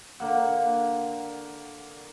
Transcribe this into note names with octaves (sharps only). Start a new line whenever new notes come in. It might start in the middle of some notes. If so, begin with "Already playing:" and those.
D3 A#3 F#5